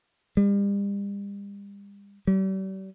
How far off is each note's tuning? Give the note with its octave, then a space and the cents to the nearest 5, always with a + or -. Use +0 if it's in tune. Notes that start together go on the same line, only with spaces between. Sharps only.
G3 +40
G3 -40